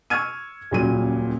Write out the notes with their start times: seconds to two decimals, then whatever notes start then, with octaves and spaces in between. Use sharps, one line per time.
0.10 C#6 E6 F6 G#6 D#7
0.71 D#1 C#2 A#2 F#3 D#7